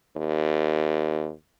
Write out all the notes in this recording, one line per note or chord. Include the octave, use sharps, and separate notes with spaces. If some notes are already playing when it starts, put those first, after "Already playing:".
D#2